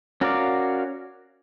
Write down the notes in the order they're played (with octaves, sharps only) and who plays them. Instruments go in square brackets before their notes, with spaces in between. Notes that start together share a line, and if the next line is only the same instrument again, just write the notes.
[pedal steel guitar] C#4 F#4 A#4 D5 F5